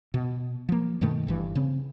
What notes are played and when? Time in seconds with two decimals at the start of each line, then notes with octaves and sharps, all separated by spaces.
0.14 B2
0.69 F3 A#3
1.01 G2 B2 D#3 A3
1.27 G1 G2 E3
1.55 C#3 C4